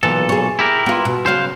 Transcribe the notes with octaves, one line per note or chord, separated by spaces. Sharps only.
B1 A#2 E3 A4
G#4 C#5
E4 G4 A#4
B3 F4
B2
C#3 F#3 B3 C5 F5